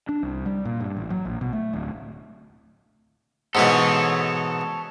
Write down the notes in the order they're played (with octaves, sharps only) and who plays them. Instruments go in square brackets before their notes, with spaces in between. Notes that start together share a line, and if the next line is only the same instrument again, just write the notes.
[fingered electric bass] D4
C2
G3
A#2
G2
A1
F#3
A#1
B2
A3
D1
[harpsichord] G#2 B2 E3 [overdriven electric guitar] A4 C#5